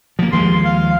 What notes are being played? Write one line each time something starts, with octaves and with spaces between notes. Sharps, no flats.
F3 A#3
D#2 F3 G#3 C6
F5